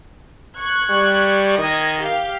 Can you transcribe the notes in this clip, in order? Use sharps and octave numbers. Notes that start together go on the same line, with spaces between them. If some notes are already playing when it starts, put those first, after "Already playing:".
C#6 F#6 G#6
G3
D#3 D#5 G#6
G4 F5